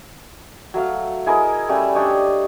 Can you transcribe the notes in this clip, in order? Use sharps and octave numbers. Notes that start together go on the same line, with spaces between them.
F#3 A3 F5
E4 G#4 A#4 D#5
G3 A3 C#4 E5
D4 G4 C#5 D#5